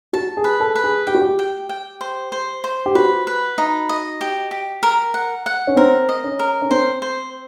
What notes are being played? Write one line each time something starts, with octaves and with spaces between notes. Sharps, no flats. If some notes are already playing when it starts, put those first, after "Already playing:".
F#4 A5
G#4
B4
A4
B4
G#4
G4 G5
F#4
G4
G5
G5
C5
C5
C5
G4
F#4 B4
B4
D#4
D#5
G4
G4
A#4
F#5
F#5
C#4
C4 A#4
D#5
C#4
A#4
C#4
C4 C5
C5